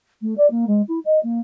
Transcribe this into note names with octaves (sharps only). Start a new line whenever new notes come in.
A3
D5
A#3
G#3
E4
D#5
A#3